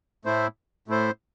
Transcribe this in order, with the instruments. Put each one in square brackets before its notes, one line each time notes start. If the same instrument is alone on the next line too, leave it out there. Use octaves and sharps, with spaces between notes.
[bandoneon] A2 A3 E4 C5
A2 A3 E4 C5